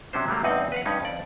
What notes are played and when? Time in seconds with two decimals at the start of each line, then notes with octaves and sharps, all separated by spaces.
0.13 C3 F#3 C#4 D4 C5
0.28 F#3 G3 A3 A#3
0.43 E2 G2 C4 D#4 D#5 F#5
0.72 B4 F5 F#5
0.86 G2 C#4 D#4
1.02 F2 D5